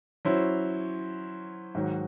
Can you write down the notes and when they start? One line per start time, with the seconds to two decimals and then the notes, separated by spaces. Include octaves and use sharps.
0.25 F#3 C#4 E4 C5
1.75 G#2 D#3 F#3